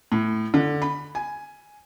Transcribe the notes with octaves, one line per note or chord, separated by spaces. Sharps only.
A2
D3
B5
G#5